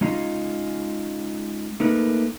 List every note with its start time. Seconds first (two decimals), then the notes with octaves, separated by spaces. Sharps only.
0.01 G#3 C#4 D#4 F4
1.80 A3 A#3 D#4 A#4 B4